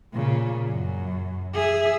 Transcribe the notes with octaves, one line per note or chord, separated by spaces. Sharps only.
A#2 C#3
F#2
G#4 E5